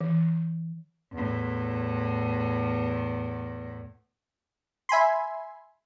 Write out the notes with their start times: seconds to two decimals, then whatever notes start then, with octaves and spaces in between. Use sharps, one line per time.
0.01 E3
1.13 E2 A2
4.89 E5 G#5 B5 C6